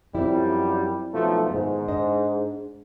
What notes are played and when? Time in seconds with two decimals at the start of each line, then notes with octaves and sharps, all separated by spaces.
0.15 F#2 F3 G3 C4 E4
1.14 B1 F3 A3
1.50 G#2 D#3 B3
1.88 D4 C5 D#5